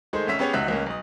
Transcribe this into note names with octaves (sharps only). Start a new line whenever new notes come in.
D#3 G#3 A3 D#4 G#4 C5
G#1 C#4 E5 B6
B3 C#4 G4 G#4 C#5
C#2 D#4 F#4 E5 F#6 B6
C#2 A#3 C#4
B1 D#6